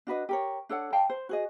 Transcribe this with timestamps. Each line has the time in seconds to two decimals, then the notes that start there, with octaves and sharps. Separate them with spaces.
0.07 D4 F#4 B4 D#5
0.29 G4 A#4 C#5
0.69 D4 A4 C#5 F#5
0.93 D5 F5 G5 A5
1.10 C5
1.29 F#4 G#4 D#5